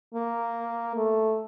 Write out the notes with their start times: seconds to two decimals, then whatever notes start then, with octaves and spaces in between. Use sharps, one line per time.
0.15 A#3
0.96 A3